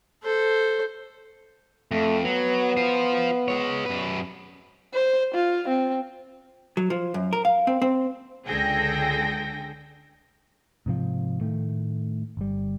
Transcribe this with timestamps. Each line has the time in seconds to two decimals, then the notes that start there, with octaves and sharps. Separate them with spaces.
0.23 A4 C5
1.91 F2 A3
2.25 F#3 B3
2.77 F4 C5
3.48 G#3 C#5
3.86 F#2 B4
4.94 C5
5.35 F4
5.68 C4
6.77 F#3
6.90 F3
7.14 F#2
7.33 A#4
7.45 F5
7.67 C4
7.82 C4
8.46 C#2 D3 G#4 A4 G5 A#6
10.86 G#2 C3 F3
11.41 A2 D#3 A3
12.37 G1 G3